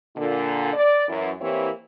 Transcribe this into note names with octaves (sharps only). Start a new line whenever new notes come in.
A#2 D3
D5
F#2 E3
E3 A#3 C4 E4 G4 C#5